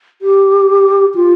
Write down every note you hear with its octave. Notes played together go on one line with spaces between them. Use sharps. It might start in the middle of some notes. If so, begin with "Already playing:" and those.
G4
F4